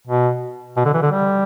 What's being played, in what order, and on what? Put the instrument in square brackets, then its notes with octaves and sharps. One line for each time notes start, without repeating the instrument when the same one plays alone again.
[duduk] B2
B2
D3
E3
D3
G3